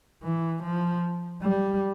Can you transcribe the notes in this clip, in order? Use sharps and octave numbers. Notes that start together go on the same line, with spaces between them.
E3
F3
G3